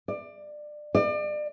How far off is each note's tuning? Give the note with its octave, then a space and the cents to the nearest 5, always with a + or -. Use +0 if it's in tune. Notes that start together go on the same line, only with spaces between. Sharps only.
D5 +25
D5 +35